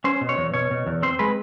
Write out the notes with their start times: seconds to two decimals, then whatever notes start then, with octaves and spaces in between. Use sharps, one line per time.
0.04 C#4 C5
0.21 B2
0.29 C#5
0.38 E2
0.54 B2 C#5
0.71 B2
0.87 E2
1.03 C4 C5
1.19 G#3 B4